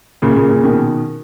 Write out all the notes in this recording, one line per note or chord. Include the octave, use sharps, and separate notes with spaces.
A#2 C#3
A#2 C#3
A#2 C#3
B2 D#3